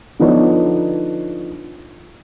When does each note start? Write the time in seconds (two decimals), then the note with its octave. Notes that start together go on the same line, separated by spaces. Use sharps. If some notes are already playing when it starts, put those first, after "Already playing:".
0.20 D3 F3 B3 D4 D#4 C#5